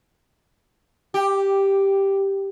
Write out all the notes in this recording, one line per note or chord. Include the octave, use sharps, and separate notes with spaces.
G4